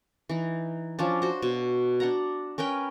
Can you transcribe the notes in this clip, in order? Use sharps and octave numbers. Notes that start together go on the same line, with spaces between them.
E3 D#4
F3 C#4 D4
F#4 C5
B2
D4 F#5 A#5
C#4 A#4 B4 G5